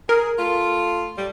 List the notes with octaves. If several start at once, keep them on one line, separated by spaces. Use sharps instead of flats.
G#4 A#4
A3 F4
A2 G3